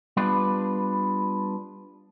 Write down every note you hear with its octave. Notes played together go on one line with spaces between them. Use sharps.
G3 B3 D4 F4 B4